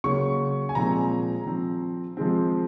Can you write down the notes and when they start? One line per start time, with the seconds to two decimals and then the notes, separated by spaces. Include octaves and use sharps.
0.04 C#3 F#3 A#3 C#6
0.69 G#5
0.75 A#2 F3 G#3 C4 A#5
1.46 F3 C4
2.17 F3 G#3 C4